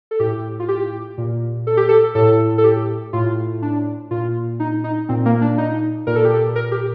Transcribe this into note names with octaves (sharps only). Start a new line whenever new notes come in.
A4
A2 G4
F4
G4
A#2
A4
G4
A4
A2 A4
A4
G4
A2 F4
D4
A#2 F4
D#4
D#4
A#2 C4
A#3
D4
D#4
A#2 A#4
A4
G4
A4
A#4
G4